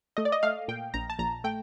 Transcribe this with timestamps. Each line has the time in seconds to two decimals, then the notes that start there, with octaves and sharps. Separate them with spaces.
0.17 A3 D#5
0.25 D5
0.32 D#5
0.43 A3 F5
0.68 A#2 G5
0.94 A#1 A#5
1.10 A5
1.19 A#1 A#5
1.44 A3 G5